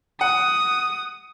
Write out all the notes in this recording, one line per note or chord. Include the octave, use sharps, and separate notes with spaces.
F#5 D#6